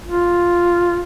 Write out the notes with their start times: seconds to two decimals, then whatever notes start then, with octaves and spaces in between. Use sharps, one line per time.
0.07 F4